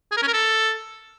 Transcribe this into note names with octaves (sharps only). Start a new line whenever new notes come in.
G#4
A#4
C#4
A#4
A4